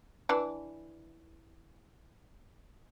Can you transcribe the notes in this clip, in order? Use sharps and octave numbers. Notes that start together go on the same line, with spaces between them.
E3 D4